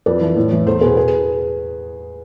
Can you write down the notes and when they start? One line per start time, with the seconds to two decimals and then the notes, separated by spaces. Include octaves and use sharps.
0.06 F2 B4 D5
0.21 E3
0.36 A2
0.52 E3
0.66 E2 A4 C5
0.81 B2 G#4 B4
0.97 G#4 B4